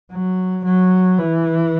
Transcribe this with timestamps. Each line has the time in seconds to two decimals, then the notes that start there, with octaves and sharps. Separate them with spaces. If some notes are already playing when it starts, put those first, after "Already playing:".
0.12 F#3
0.65 F#3
1.19 E3